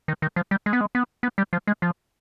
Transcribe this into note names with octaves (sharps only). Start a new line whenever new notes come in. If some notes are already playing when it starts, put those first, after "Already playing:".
D#3
D#3
F3
G3
G#3
B3
G#3
B3
B3
G3
F3
G#3
F3